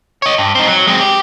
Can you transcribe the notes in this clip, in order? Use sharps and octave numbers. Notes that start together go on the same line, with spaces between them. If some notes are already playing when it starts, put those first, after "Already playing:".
C#5 D#5
G2
C4 D#4
F#3
G#3 C4
G4